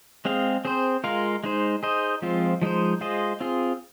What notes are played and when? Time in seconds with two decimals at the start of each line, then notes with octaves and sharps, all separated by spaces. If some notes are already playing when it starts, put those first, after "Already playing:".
0.25 G#3 C4 G#4 F5
0.65 C4 G#4 C5
1.04 G#3 F4 A#4 F5
1.44 G#3 D#4 C5
1.83 D#4 G#4 C5 D#5
2.22 F3 G#3 C4 F4
2.62 F3 G#3 D#4 C5
3.01 G#3 F4 G#4 C5 D#5
3.40 C4 F4 G#4